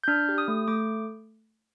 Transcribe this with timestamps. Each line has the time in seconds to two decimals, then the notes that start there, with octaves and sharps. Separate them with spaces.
0.04 G6
0.08 D4 F6
0.29 G4
0.38 D#6
0.48 A3
0.68 A3 D6